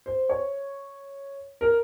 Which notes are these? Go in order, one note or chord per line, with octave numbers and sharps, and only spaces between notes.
C5
C#5
A#4